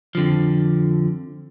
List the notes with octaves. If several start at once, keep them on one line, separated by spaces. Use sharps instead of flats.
F2 D3 F3